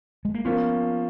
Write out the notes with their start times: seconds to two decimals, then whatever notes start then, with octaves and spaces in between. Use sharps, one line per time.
0.25 G#3
0.34 A#3
0.45 F3 A#3 B3 C#4